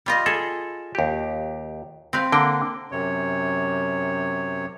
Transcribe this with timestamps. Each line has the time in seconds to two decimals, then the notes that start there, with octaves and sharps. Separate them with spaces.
0.06 G3 F4 D#5
0.26 G#4 A4
0.95 D#2 G4
2.13 C4 B4 F5
2.32 D3 A#3 G5
2.92 F#2 C3 C#5